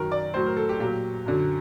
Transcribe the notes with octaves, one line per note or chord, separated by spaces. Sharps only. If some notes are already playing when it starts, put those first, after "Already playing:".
Already playing: F#2 D#3 F#3 A#4
D5
A2 F#3 C5
A#4
A4
G4
A#2 F#3 G4
F#2 D3 F#3